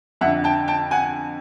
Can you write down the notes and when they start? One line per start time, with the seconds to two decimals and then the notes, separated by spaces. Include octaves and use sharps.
0.21 F2 E5 F#5
0.24 D3
0.44 G5 A5
0.68 G5 A5
0.91 F#5 G#5